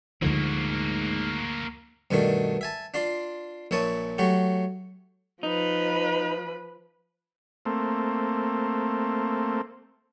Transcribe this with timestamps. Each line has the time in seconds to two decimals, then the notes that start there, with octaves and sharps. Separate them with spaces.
0.22 D2 G#2 D3 F3 A#3 F#4
2.11 G2 B2 D#3 A3 D4
2.61 E5 G#5 A5
2.94 D4 F4 D5 C6
3.71 A#1 A#2 E4 C#5 A5 D#6
4.18 F#3 A3 F#4 G4
5.43 F3 D#4 B4
7.66 A3 A#3 C4